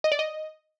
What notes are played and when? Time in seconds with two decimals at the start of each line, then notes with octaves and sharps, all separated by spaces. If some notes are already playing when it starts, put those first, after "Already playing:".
0.04 D#5
0.12 D5
0.19 D#5